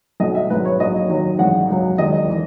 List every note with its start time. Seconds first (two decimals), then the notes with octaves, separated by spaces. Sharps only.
0.20 B1 B2 F#3 D#5
0.35 E5
0.50 G#1 G#2 F#3 B4
0.65 C#5
0.80 A#1 A#2 F#3 D#5
1.09 D#2 D#3 F#3
1.38 G#1 F#2 C#3 E3 F#5
1.69 C#2 C#3 F#3
1.98 E1 D#2 D#3 F#3 D#5
2.30 E3